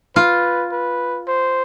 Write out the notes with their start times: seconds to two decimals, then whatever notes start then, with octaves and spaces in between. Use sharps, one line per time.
0.16 F4 B4
0.72 B4
1.28 C5